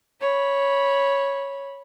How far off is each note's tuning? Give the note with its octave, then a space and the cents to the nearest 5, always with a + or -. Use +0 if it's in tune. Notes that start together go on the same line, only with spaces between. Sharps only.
C#5 +0 B5 -15